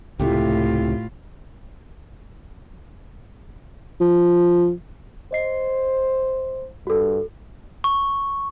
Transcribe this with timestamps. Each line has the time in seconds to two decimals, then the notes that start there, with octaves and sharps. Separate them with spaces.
0.20 C#2 A2 C3 A3 E4 F4 G4
4.01 F3
5.33 C5 D#5 C7
6.87 G2 F#4 A4
7.84 C#6